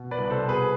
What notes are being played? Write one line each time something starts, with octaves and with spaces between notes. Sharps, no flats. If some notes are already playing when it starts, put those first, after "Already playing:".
Already playing: B2
B4 D5
C2
A4 C5
B2
G#4 B4